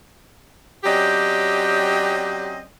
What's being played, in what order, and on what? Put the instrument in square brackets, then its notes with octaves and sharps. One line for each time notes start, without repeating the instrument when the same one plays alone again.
[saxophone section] F#3 C4 C#4 G4 D5 D#5